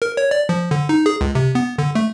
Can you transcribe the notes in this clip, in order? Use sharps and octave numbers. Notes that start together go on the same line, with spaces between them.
A#4
C#5
D5
F3
D3
D#4
G#4
C#2
C3
B3
D3
A3